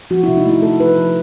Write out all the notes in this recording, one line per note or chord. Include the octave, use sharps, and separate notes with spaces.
F3 F#4
E4
C3
D#4
A3 E4
A3 A4
F3 B4
F3